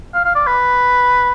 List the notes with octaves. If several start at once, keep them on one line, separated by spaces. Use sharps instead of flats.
F5
F5
D5
B4